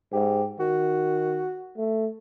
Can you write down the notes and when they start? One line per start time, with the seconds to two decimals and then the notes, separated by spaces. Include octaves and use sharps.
0.13 G#2 G4
0.60 D#3 F#4
1.77 A3